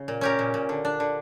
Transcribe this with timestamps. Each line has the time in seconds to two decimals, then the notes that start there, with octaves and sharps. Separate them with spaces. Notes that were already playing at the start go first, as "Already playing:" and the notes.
Already playing: C#3
0.08 A#2
0.21 C#4 G4 A#4
0.39 A#2
0.54 A#2
0.69 D3
0.85 D4
1.00 D3